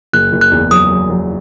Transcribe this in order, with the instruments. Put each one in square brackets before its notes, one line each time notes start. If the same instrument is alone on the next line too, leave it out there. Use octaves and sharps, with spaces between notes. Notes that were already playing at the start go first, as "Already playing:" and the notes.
[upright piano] F#1 [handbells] F#6
[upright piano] F#1
[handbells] F#6
[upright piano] E2
[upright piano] F#3 [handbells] D#6
[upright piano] F#3
F#3